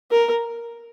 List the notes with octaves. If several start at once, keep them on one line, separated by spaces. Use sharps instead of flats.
A#4